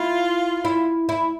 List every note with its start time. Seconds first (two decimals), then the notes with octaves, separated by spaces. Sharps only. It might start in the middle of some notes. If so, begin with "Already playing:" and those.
Already playing: E4 F4
0.65 E4
1.09 E4